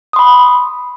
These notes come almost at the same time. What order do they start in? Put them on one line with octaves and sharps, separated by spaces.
D#6 C6 B5